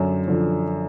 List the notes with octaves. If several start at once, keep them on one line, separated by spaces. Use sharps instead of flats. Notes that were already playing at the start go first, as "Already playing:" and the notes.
Already playing: F#2 D3
D3 F3